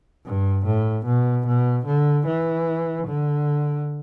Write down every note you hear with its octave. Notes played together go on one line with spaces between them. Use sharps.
G2
A2
B2
B2
D3
E3
D3